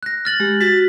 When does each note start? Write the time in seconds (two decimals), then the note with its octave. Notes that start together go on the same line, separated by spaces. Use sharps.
0.03 F#6 A#6
0.25 F6 A6 F#7
0.40 G#3 G4
0.61 F#4 A6 B6